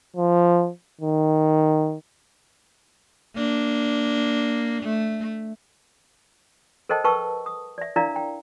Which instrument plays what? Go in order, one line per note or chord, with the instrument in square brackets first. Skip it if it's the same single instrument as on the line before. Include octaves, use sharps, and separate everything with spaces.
[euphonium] F3
D#3
[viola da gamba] A#3 D4
A3
[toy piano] A4 A#4 C5 D#5 G5 A5
A#4 B4 G5 A5 C#6 E6
D#6
D5 E5
D4 E4 A#4 D5 F5 A#5
G5